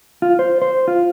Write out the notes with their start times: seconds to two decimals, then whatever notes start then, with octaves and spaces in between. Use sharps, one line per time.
0.22 F4
0.39 C5
0.62 C5
0.88 F4